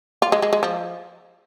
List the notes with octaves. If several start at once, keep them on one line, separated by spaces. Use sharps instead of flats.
F4
G#3
G#3
G#3
F3